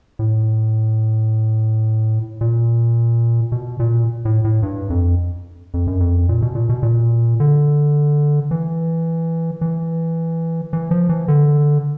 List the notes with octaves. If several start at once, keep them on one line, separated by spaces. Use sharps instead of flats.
A2
A#2
B2
A#2
A2
A2
G2
F2
F2
F#2
F2
A#2
B2
A#2
B2
A#2
D3
E3
E3
E3
F3
E3
D3